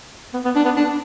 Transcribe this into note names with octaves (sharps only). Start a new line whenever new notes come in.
B3
B3
D4
B3
D4